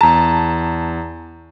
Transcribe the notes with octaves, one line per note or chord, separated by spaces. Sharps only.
E2 A5 A#5